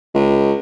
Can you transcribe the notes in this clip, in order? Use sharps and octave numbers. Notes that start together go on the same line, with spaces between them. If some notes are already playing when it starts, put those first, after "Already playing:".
C#2